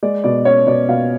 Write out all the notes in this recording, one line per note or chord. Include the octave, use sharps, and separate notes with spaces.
G#3 D5
B2 D5
C#4 C#5
B2 D5
B2 F5